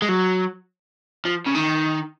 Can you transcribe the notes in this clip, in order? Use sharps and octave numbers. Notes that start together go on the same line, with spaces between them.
G#3
F#3
F3
C#3
D#3